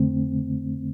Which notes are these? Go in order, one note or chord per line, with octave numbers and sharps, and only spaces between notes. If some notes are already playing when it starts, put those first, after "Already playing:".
Already playing: F2 D3 A3 C4